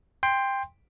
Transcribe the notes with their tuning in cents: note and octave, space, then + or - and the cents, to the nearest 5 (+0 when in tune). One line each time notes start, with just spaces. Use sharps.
G5 +20 C6 +0